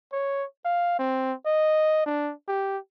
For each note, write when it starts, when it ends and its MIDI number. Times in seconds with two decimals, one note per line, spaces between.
0.12 0.45 73
0.65 0.96 77
0.99 1.33 60
1.46 2.05 75
2.06 2.32 62
2.48 2.77 67